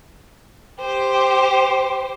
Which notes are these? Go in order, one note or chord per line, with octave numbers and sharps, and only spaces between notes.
G4 C5